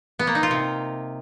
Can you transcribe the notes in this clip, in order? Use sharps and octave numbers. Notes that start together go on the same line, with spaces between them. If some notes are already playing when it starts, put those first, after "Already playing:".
B3
A#3
D#4
F4
C3